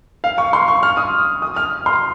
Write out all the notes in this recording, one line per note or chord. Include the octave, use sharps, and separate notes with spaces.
F5
C#6
C6
C#6
F6
D#6
D#6
F6
C6